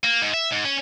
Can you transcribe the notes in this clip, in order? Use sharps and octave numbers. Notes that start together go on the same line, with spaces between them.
A#3
G#2
E5
G#2
C#4